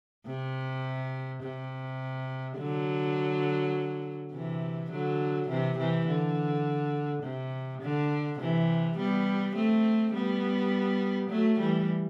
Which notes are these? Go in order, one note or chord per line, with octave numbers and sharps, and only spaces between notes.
C3
C3
D3 F#3
C3 E3
D3 F#3
C3 E3
C3 E3
D3
C3
D3
C3 E3
G3 B3
A3 C4
G3 B3
F#3 A3
E3 G3